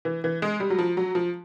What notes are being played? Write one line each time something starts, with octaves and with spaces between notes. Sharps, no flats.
E3
E3
G#3
G3
F#3
F3
F#3
F3